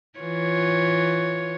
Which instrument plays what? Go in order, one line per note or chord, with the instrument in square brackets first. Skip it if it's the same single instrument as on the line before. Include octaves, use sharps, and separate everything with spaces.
[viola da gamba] E3 F4 C#5